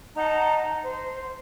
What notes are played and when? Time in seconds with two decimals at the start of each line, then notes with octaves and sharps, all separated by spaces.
0.15 D#4 F#5 A5 A#5
0.83 C5